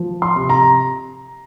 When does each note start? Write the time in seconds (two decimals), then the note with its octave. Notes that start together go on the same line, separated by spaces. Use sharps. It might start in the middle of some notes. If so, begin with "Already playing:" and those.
Already playing: F3
0.22 C6
0.36 C3
0.49 A#5